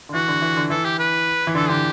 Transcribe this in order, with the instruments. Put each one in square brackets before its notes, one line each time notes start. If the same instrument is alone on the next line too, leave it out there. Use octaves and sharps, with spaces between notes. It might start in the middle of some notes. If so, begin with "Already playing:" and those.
[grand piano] D3
[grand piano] E3 [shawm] F#4
[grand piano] D3
E3
D3
[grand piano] E3 [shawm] A4
[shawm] G4
B4
[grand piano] E3
[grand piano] D3 [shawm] A4
[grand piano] D3 [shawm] G4